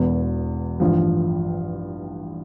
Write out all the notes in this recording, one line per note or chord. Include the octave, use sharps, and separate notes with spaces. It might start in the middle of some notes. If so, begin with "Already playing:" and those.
Already playing: E1 E2 B2 B3
A1 G2 F3